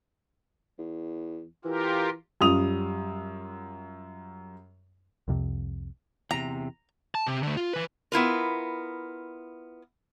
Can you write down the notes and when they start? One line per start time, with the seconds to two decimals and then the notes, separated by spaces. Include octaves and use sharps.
0.79 E2
1.65 E3 F4 G4 A#4
2.41 F#2 G3 F4 D#6 F7
5.28 C2 F2 C3
6.31 E2 C3 A#5
7.15 A5
7.26 C3
7.43 D3 A3
7.57 F4
7.73 E3 B4
8.12 B3 E4 F4 A#4